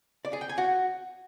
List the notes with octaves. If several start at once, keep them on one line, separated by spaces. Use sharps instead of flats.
D5
G#4
G5
G#5
F#4